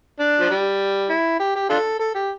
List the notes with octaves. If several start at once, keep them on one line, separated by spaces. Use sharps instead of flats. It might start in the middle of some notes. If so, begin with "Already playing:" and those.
D4
F3
G3
E4
G4
G4
D4 F4 A4
A4
G4